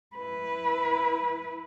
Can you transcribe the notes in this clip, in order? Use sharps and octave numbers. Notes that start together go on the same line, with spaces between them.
E4 B4